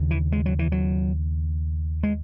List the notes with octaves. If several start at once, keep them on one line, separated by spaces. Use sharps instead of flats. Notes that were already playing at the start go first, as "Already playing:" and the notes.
Already playing: D#2 C#3
E3
G#3
F#3
E3
F#3
G#3